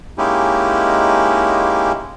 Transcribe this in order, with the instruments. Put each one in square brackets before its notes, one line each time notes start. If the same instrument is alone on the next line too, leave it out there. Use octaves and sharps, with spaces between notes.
[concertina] G#3 A#3 C#4 D#4 E4 G4